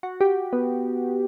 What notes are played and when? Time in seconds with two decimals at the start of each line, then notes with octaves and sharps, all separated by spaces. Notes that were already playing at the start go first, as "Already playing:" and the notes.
0.03 F#4
0.21 G4
0.53 B3